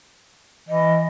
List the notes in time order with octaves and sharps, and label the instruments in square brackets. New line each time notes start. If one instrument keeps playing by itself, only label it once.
[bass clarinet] E3 [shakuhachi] D#5